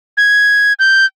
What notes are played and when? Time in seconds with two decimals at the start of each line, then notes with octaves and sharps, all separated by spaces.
0.17 G#6
0.79 G6